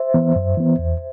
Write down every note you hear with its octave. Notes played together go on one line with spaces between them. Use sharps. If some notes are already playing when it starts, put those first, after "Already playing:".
Already playing: C5 E5
E3 B3
F#2
E3 B3
E2